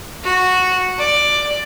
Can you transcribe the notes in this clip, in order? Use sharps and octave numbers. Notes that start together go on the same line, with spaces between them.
F#4
D5